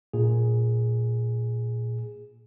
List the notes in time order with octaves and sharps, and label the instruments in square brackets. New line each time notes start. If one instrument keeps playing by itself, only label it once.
[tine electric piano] A#2 G#4